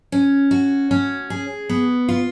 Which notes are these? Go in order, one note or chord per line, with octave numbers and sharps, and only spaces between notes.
C#4
F#4
C#4
G#4
B3
F4